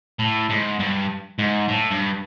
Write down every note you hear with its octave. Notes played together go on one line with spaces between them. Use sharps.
A2
G#2
G2
G#2
A2
G2